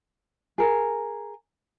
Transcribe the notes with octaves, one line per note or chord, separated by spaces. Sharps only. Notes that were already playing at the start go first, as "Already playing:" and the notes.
G#4 A#4